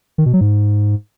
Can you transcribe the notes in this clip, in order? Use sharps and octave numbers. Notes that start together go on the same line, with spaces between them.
D#3
B2
F#3
G#2